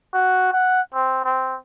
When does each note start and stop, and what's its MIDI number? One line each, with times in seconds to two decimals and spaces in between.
0.14 0.51 66
0.53 0.82 78
0.94 1.24 60
1.24 1.57 60